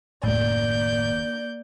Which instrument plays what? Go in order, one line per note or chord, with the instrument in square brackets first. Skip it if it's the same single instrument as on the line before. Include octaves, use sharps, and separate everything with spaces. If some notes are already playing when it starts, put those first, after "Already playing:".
[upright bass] F#1 D#2 [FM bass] A2 [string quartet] A#3 D5 G6